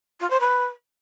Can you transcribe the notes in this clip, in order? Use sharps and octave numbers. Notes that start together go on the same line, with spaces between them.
F4
C5
B4